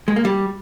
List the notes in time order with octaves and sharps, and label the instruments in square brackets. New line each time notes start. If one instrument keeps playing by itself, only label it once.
[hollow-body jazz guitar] G#3
A#3
G3